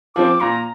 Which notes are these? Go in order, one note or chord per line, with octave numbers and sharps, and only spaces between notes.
F3 C4 D6
A#2 A#5